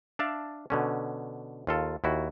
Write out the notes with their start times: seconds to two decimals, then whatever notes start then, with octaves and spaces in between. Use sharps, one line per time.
0.19 D4 D5 E5 F5 A5
0.70 B2 D3 C#4
1.67 D#2 F4 A4
2.04 D#2 E4 F#4